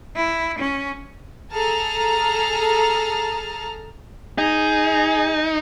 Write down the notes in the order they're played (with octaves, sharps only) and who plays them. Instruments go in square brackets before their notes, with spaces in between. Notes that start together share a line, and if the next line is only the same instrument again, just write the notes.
[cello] E4
C#4
[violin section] G#4 A4 A5 A#5 F6
[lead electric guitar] D#4 [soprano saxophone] G#4